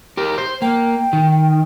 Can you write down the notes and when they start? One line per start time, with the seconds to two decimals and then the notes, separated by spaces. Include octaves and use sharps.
0.17 G4 A#4
0.38 C5
0.62 A#3 G5
1.13 D#3